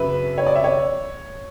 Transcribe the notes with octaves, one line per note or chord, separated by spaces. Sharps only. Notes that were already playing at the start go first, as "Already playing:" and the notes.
Already playing: F#2 C#3 F#3 B4 E5
C#5
D5
E5
C#5